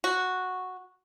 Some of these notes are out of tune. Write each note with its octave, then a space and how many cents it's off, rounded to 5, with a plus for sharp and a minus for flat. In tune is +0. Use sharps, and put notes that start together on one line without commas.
F#4 -5